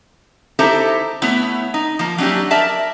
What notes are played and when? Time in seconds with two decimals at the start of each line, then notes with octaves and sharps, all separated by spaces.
0.59 D#4 E4 G4 A4 C5 E5
1.22 A3 B3 E4 C#5
1.74 D#4
1.99 F3 A#3
2.18 F#3 C#4 D4 E4 G4
2.51 A#4 D5 E5 A5